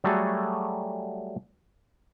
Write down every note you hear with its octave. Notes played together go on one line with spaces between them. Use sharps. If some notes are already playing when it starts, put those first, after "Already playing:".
F#3 G3 A3 F#4 G#4 A4